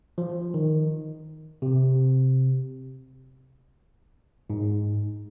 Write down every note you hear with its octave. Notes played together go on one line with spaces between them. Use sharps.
F3
D#3
C3
G#2